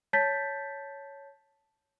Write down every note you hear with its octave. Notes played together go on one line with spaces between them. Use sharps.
C#5 A5 G6 A6 B6